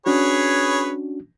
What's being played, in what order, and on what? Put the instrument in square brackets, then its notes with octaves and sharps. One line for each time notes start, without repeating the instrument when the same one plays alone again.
[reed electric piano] C#4 D4 F#4 [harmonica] G#4 B4 C#5